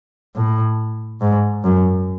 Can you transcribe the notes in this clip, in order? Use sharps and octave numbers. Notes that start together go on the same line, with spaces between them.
A2
G#2
F#2